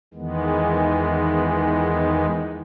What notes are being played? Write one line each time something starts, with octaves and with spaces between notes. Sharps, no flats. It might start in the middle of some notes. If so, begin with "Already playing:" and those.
E2 D#3 E3 G#3 B3